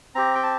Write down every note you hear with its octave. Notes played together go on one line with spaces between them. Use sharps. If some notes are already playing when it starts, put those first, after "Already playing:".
C4 G4 A#5
G5
A5